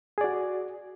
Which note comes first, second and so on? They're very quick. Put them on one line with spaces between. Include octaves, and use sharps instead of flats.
G#4 D5 F#4